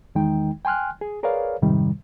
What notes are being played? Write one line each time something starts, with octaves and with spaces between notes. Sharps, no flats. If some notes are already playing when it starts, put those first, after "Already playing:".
E2 D#3 G#3 D#4 G5
G5 G#5 C6 F6 F#6
G#4
G#4 A#4 B4 C#5 D5 F5
F2 G#2 C3 D#3 G3